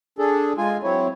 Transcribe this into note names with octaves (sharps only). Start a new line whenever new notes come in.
D4 G#4 A4
G#3 F4 G#5
F#3 C4 E4 C#5